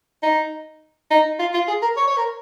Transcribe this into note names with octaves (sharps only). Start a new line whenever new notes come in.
D#4
D#4
F4
F4
G#4
A#4
C#5
C#5
A#4